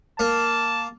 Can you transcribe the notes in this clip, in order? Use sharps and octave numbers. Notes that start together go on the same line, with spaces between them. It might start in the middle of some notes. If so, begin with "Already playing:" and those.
A#3 A5